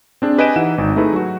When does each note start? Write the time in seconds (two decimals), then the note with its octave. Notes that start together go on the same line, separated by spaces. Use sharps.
0.22 C4 D4 G#4
0.38 G4 B4 D#5 G#5 D7 E7
0.56 E3 D#4 E4 F#5 E7
0.78 G#1 D#4
0.96 A3 D#4 E4 G#4 B4
1.13 F#3 F#4